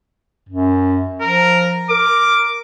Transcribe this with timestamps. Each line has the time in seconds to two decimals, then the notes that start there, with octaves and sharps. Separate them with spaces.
0.49 F#2
1.21 F3 A#4
1.90 A#4 D6